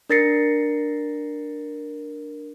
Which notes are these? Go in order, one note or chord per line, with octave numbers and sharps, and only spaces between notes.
D4 A#4 A6 A#6 C7 C#7